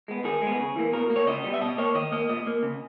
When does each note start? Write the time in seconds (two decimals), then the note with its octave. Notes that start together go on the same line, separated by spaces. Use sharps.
0.08 G#3 B3
0.25 D#3 G#4
0.42 G#3
0.47 B3
0.59 C#3
0.76 E3 A#3
0.93 B2 A#4
1.10 A#3
1.16 C#5
1.27 C#3 D#5
1.44 G3 B3
1.54 E5
1.61 B2 D#5
1.78 A#3 C#5
1.95 D#3 D#5
2.12 A#3 D#5
2.29 A#2 D#5
2.47 A#3
2.63 C#3